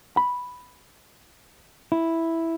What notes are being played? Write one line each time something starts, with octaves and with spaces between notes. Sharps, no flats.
B5
E4